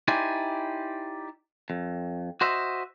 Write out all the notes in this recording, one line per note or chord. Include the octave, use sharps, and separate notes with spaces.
D#4 E4 G4 C5 D5 G#5
F2
F#4 C5 D#5 E5